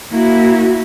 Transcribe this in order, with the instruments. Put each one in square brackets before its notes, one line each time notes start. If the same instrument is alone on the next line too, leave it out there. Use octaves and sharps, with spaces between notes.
[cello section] A#3 E4 F#4